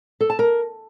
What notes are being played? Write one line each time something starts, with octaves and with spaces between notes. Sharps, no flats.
A4
A5
A#4